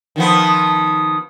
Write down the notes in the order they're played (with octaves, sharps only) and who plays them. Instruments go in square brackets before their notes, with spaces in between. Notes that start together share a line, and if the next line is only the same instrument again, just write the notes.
[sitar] D#3 F3 B3